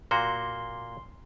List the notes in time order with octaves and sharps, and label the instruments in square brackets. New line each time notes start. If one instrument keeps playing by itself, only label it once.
[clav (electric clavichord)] A#2 A#3 F#4 [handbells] C6